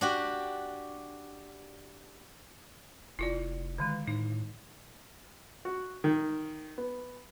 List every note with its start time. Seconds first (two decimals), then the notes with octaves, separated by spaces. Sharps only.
0.01 D4 F#4 G4
3.19 F1 E4 F4 D5
3.78 D3 D#3 G#3
4.08 A2 D#4
5.65 F#4
6.04 D#3
6.78 B3